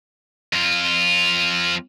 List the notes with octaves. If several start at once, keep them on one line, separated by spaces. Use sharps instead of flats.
F2 F4